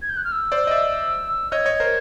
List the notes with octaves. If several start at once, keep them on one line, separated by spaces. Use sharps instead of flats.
G#6
G6
F#6
F6
E6
C5 D5
D#5
D5 E5
C#5 D#5 G#6
C#5 D#5
A#4 C5